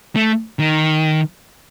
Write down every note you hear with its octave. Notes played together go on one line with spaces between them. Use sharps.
A3
D#3